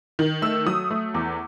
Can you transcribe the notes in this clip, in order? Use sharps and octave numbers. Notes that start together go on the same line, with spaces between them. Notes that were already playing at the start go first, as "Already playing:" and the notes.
D#3
A3 E6
F#3 D#6
A3
E2 D6